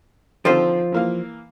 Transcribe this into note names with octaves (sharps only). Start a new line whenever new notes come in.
D3 D#3 F3 C4 F4 C5
E3 A#3 F5